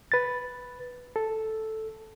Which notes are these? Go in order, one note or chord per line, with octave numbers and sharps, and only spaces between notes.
B4 A6
A4